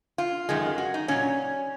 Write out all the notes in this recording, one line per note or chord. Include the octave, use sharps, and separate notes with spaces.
F4
F#2 D#3 G#3
F#4
D#4
A#2 F#3 C#4